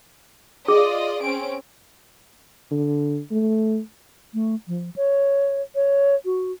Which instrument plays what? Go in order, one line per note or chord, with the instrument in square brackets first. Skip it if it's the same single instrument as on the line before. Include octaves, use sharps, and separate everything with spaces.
[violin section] F4 D5 D#5 [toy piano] G#4
[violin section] C4 C#4 D7
[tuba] D3
A3
[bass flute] A3
F3
C#5
C#5
F#4